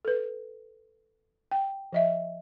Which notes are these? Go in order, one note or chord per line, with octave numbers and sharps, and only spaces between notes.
A4 B4
G5
F3 D#5 E5